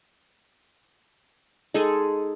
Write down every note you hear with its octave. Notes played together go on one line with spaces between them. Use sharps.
G#3 D#4 G#4 A4